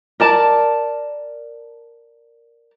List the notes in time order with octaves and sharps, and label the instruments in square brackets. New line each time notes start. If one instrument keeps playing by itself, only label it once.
[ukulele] A#4 D5 A5